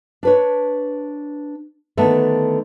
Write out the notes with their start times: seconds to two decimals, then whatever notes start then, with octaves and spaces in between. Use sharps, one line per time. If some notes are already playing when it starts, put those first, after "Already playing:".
0.23 D4 B4 C#5
1.97 D3 D#3 A3 B3 B4